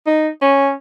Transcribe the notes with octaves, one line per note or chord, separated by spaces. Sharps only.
D#4
C#4